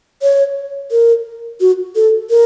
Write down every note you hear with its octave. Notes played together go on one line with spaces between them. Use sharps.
C#5
A#4
F#4
A4
A#4